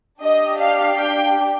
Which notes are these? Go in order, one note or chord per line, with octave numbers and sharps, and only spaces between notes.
D4 G4 D#5
F5
G5